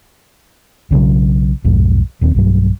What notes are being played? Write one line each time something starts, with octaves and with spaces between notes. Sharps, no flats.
B1 C#3 E3 F#3
B1 F2 G#2
D#1 D#2 C4
B1 G2 F#3